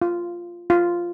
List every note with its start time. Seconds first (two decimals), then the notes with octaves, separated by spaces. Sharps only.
0.02 F4
0.70 F4